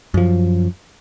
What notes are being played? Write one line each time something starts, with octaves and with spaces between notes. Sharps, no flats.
F#2 F3